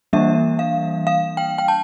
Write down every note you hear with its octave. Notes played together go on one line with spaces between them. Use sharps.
E3 G3 A#3 D4 E5
F5
F5
G5
G5
A5